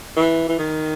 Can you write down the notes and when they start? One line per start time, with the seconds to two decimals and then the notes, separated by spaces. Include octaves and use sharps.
0.17 E3
0.49 E3
0.59 D#3